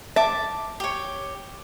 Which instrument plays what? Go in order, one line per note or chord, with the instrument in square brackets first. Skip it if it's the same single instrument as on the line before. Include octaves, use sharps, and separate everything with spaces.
[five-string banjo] E5 [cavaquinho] A5 D6
[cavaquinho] G4 C#5